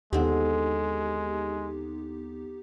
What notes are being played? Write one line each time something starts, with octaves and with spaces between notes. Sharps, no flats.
D#2 D3 G#3 B3 C4 D#4 G4